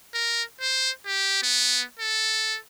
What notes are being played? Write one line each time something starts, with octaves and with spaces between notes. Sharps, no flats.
A#4
C5
G4
B3
A4